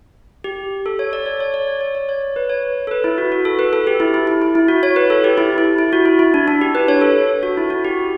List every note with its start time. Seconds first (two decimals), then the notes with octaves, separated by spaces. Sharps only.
0.44 G4
0.86 A4
0.99 C#5
1.13 D5
1.26 C#5
1.40 C#5
1.54 D5
1.68 C#5
1.81 C#5
1.95 D5
2.09 C#5
2.36 B4
2.49 C#5
2.87 A4
2.91 B4
3.04 E4
3.18 F#4
3.32 F#4
3.45 A4
3.59 B4
3.73 A4
3.87 G4
4.00 E4
4.14 E4
4.27 E4
4.42 E4
4.55 E4
4.68 F#4
4.83 C#5
4.96 B4
5.10 A4
5.24 G4
5.38 E4
5.58 E4
5.78 E4
5.93 F#4
6.05 E4
6.19 E4
6.34 D4
6.48 D4
6.61 G4
6.75 B4
6.88 C#5
7.01 A4
7.43 F#4
7.57 E4
7.70 F#4
7.85 G4